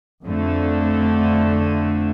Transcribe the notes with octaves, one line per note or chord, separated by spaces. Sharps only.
F2 D3 A3